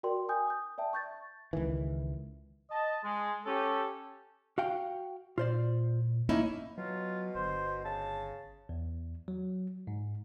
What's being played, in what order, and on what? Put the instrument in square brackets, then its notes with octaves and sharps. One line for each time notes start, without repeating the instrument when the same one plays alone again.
[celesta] F#4 A#4 D5 G5 C6
G5 G#5 D#6 G6
D#6 G6
D5 E5 G5 A5
C#6 G6 A6
[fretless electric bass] C#2 D#3 E3
[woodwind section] D#5 A5
G#3
C#4 G4 A4
[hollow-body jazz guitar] F#4 F5 G5
[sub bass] A#2 [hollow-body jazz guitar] F4 C5 D5
[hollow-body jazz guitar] A3 A#3 [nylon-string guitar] C#4 D#4 E4
[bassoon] B2 [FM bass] F#3 [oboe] F4
[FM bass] G1 [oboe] C5
[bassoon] C#3 [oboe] A5
[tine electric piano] E2
F#3
G#2